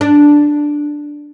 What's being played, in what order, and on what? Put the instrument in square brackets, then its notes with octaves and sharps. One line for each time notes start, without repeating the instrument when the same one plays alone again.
[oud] D4